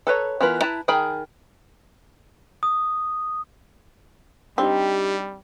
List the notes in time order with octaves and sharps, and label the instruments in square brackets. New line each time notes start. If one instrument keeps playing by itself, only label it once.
[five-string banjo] A4 B4 C#5 A#5
E3 B3 F4 A#4 B4
E4 B4 A5 A#5
D#3 G#4 A#4 G5 B5
[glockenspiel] D#6
[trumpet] G3 [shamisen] C4 [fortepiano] D4 D#4 [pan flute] G4